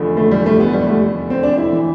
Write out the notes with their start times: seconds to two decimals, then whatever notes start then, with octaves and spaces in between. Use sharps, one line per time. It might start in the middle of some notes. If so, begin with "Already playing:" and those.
Already playing: F1 E2 D3 F3
0.17 A3
0.31 G3
0.46 A3
0.60 B3
0.73 G3
0.87 A3
1.30 C4
1.43 D4
1.58 E4
1.73 E3